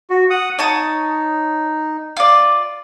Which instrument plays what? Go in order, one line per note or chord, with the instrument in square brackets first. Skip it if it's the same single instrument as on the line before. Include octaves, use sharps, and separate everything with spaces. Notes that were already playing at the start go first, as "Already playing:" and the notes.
[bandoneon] F#4
F#5 D#6
[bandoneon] D#4 [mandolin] C#5 A5 D#6
[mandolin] F4 D5